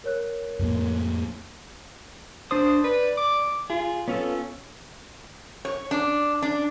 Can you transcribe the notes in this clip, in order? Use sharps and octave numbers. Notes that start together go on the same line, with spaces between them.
A#4 C#5 F#6
F2 A2 A#3
D4 C5 D#6
B4 D5
D6
F4 G#4
B3 C#4 F4 A4
C#5
D4
D4